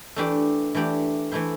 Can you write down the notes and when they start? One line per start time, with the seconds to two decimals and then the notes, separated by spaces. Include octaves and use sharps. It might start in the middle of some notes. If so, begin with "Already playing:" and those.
0.16 E3 A3 D4 G4 D5
0.75 E3 A3 D4 G4 D5
1.32 E3 A3 E4 C5